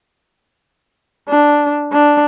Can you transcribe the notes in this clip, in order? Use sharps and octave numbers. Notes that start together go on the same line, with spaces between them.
D4
D4